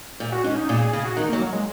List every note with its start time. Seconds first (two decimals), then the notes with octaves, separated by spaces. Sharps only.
0.20 A#2
0.32 F#4
0.44 G#2 C#4
0.57 D#4
0.69 A#2 G#4
0.81 G#4
0.93 C#3 G#4
1.05 F#4
1.17 D#3 D#4
1.29 F#3 A#3
1.42 F#3
1.53 G#3